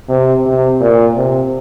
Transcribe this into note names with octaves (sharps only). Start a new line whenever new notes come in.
C3
C3
A#2
C3